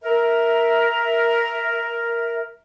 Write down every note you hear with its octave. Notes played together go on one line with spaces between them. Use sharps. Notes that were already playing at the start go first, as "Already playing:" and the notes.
A#4 E5